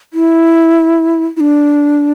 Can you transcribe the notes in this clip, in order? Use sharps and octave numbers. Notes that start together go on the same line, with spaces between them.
E4
E4
D4